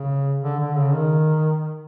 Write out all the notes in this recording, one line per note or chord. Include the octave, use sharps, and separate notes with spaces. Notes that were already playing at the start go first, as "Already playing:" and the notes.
Already playing: C#3
D3
D3
C#3
D#3